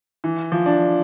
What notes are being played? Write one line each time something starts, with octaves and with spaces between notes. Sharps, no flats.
E3
F3
D4